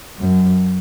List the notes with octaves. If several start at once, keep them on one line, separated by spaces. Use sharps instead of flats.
F#2